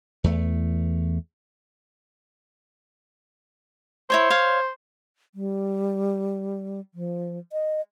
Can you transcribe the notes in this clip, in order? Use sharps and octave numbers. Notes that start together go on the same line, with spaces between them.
E2 A3
E4 C5 C#5 C#6
C#5 F5 C6
G3
F3
D#5